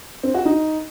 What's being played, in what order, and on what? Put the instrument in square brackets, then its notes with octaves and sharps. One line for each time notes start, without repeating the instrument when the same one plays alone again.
[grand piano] C4
F#4
D#4